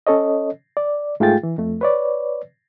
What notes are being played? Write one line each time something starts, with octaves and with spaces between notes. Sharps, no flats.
C#4 A4 C#5 D#5
D5
G#2 A3 F4 G#4 G5 A6
E3
F2 A3
B4 C#5 D5